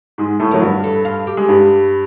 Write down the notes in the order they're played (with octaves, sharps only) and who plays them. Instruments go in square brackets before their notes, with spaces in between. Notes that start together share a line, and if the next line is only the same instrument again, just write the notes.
[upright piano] G#2 G#3
A2 A3
[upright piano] F#3 [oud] A#4
[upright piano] G2 G3
[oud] A4
F4
G4
[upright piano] G#3
G2 G3